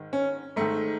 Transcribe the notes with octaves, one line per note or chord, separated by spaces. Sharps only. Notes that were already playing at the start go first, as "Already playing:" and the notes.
Already playing: G#2 D#3
C#4
G#2 D#3 A3